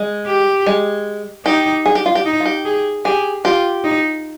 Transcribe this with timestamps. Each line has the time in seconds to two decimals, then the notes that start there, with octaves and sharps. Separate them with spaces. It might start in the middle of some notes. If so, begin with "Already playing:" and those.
Already playing: G#3
0.27 G4
0.66 G#3
1.46 D#4 G4
1.86 G#4
1.95 G4
2.06 F4
2.15 G4
2.25 D#4
2.40 F4
2.45 G4
2.65 G#4
3.05 G4 G#4
3.44 F4 G4
3.84 D#4